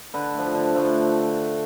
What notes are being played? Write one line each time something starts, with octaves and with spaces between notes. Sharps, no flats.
D3 B4
F3 A3
D3
F3 A3